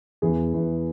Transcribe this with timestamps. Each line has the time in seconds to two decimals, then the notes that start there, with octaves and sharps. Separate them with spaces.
0.22 E2 G#4
0.54 E2